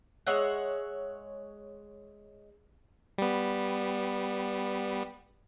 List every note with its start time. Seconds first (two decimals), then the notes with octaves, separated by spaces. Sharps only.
0.27 G#3 C#5 E5 F#5
3.18 G3 B3